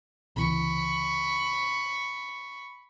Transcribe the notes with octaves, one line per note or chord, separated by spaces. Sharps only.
C#2 C3 E3 B5 C#6